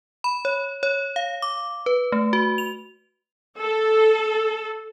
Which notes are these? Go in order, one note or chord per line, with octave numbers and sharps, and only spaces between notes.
B5
C#5
C#5
F5
D6
B4
A3
F#4
F7
A4